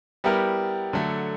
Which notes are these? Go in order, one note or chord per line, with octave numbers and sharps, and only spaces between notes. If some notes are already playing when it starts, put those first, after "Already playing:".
G3 B3 E4 G4 A#4
D3 F#3 A3